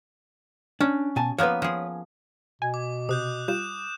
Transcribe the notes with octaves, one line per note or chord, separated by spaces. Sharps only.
C#4 D4
B2 G#5 A5
F3 A#3 B3 B4 C#5
F3 G#4
B2 G#5
D6
C3 D#6 F#6 G6
G3 F4 G6 E7